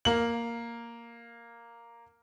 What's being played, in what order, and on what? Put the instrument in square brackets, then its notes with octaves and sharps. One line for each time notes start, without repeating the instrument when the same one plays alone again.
[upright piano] A#3 F#7